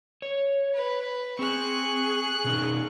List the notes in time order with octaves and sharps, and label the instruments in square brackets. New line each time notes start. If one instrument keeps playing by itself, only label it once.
[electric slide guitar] C#5
[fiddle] B4
[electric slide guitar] C4 [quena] G#4 [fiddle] C#6 F#6
[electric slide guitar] B2 C#4 D#4